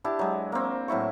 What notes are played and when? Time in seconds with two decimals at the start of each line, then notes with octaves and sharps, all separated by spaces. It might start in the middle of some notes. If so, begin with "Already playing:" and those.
0.04 D4 E4 G4 A5
0.19 F#3 G#3
0.52 A#3 C4
0.88 A2 F#3 E4 C#6